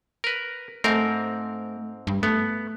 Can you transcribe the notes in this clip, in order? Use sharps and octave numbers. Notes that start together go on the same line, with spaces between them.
A#4 B4
G#2 A3 C4 A#4
G2
A3 B3